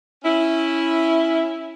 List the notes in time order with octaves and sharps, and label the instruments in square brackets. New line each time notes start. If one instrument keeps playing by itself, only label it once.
[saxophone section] C#4 E4